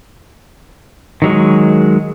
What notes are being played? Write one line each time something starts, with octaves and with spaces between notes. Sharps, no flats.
D#3 F#3 G#3